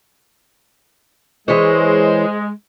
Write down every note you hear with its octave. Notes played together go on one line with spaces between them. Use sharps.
E3 G#3 C5 C#5